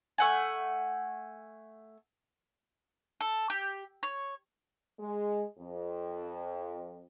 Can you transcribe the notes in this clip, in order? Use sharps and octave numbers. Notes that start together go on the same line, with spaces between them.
A3 F#5 G#5
A4
G4
C#5
G#3
F2